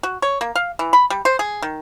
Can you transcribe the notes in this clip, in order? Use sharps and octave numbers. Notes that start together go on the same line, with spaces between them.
F#4
C#5
A#3
F5
E3
B5
G3
C5
G#4
D#3